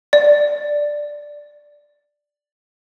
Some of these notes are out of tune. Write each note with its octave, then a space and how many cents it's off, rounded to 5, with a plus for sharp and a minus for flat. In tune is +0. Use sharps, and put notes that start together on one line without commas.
D5 +5